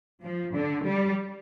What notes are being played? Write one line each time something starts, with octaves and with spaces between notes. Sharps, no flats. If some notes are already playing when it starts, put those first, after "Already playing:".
F3
D3
G3